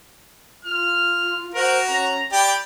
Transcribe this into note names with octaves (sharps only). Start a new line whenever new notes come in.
F4 F6
F#4 A#4 C5
C#4 A#5
G4 D5 G5 B5